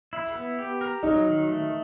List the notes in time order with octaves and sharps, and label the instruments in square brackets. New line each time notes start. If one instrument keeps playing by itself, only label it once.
[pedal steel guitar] E4
B3
G4
A#4
[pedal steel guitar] F#3 [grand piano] D#4
[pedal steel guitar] D#3
A3